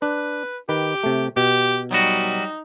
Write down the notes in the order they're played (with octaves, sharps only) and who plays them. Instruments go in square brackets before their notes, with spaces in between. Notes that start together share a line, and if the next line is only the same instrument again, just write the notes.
[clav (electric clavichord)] D4 [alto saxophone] B4
[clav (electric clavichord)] D#3 B4 [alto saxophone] G4
[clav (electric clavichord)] C3 A3
[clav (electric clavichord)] B2 [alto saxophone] G4
[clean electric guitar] F#3 G3 F#4 [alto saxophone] D#4